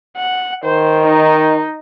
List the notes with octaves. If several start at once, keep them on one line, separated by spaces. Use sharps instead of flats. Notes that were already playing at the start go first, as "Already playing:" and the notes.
F#5
D#3 C5
D#4